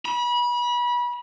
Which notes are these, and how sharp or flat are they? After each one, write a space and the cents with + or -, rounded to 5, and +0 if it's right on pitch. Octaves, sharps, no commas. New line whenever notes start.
B5 -30